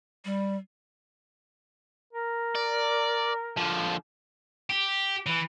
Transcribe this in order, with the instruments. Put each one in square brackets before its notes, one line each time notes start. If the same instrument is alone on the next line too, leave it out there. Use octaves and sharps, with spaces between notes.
[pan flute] G3
[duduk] A#4
[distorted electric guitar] D5
D3 F3
G4
E3